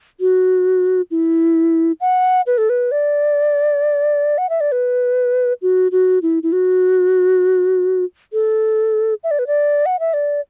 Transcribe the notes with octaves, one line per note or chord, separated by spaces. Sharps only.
F#4
E4
F#5
B4
A4
B4
D5
F#5
E5
D5
B4
F#4
F#4
E4
E4
F#4
A4
E5
D5
B4
D5
F#5
E5
D5